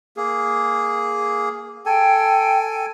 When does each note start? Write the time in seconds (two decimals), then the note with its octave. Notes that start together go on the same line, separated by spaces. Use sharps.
0.17 A#3 G#4
1.86 A4 G5 G#5